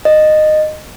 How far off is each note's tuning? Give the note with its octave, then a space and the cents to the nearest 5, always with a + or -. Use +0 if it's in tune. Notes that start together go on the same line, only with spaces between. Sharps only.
D#5 -15